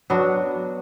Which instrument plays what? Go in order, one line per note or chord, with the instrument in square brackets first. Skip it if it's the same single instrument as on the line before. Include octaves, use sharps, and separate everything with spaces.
[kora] F#3 B3 D4 F#4